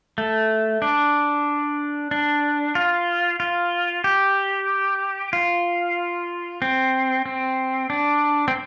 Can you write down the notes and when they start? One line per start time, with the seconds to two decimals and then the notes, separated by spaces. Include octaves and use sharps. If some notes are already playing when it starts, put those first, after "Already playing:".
0.18 A3
0.82 D4
2.11 D4
2.75 F4
3.40 F4
4.04 G4
5.33 F4
6.62 C4
7.26 C4
7.90 D4
8.48 C4